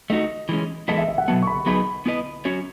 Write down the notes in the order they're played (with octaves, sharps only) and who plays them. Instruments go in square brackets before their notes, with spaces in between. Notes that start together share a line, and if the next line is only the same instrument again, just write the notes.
[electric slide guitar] A3 D#4 F#4 [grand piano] D#5
[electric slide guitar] E3 G#3 C#4
[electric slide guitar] E3 G#3 B3 E4 A4 [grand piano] D#5
[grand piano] E5
E5
F#5
[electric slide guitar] B2 F#3 B3 [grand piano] A5
[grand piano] C#6
B5
[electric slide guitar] F#3 B3 D#4 G#4 B4 [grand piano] B5
[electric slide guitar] B3 E4 B4 D#5
F#3 C#4 F#4 C#5